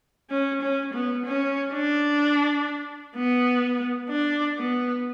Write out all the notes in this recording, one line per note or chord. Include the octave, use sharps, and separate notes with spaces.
C#4
C#4
B3
C#4
D4
B3
D4
B3